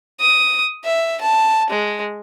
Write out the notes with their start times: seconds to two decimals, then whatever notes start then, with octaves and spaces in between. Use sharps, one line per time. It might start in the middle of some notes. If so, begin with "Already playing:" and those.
0.20 D#6
0.84 E5
1.21 A5
1.70 G#3